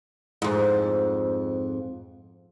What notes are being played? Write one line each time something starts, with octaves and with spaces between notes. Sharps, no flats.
F2 G#2